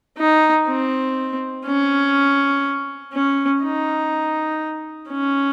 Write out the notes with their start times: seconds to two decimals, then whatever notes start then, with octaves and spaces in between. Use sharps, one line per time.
0.18 D#4
0.67 C4
1.66 C#4
3.13 C#4
3.62 D#4
5.09 C#4